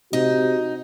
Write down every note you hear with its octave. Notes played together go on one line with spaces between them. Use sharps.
C3 D#4 F#4